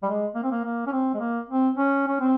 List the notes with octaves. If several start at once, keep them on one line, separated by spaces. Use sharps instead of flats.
G3
G#3
A#3
C4
A#3
A#3
C#4
C4
G#3
A#3
C4
C#4
C#4
C4